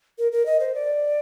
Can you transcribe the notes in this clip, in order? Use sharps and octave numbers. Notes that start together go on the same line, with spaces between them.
A#4
A#4
D#5
C5
D5